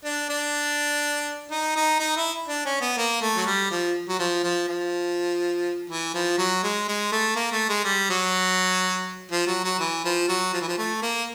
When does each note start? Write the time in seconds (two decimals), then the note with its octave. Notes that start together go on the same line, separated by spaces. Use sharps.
0.05 D4
0.29 D4
1.51 D#4
1.76 D#4
2.00 D#4
2.17 E4
2.48 D4
2.65 C#4
2.81 B3
2.98 A#3
3.22 A3
3.37 F#3
3.47 G3
3.71 F3
4.09 F#3
4.19 F3
4.43 F3
4.68 F3
5.90 E3
6.14 F3
6.38 F#3
6.64 G#3
6.88 G#3
7.12 A3
7.36 A#3
7.52 A3
7.69 G#3
7.85 G3
8.10 F#3
9.31 F3
9.47 F#3
9.64 F#3
9.80 E3
10.05 F3
10.29 F#3
10.53 F3
10.61 E3
10.68 F3
10.78 A3
11.02 A#3